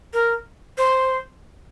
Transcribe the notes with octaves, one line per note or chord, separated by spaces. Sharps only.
A#4
C5